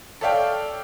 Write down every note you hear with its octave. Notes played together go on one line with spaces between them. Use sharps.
A4 C#5 D5 E5 F5 G5